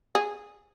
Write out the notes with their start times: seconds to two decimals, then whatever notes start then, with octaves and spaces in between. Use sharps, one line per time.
0.15 G#4